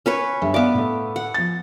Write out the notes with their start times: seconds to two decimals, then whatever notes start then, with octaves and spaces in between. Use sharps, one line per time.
0.06 C#4 B4 C#5
0.42 G1 E5
0.54 B3 D5 E5 F5 D6
0.74 A2 A3
1.16 F#5
1.34 F3 A6